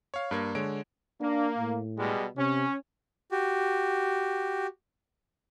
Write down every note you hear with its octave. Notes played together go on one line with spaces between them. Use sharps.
C#5 F5
G2 A#3 G#6
D3 G#3 C#5 D7
A#3 D4
A2
B2 G3 G#3
C3 C#4
F#4 G4